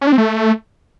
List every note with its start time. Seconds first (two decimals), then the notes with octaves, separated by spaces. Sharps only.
0.01 C#4
0.07 D4
0.12 C4
0.18 A3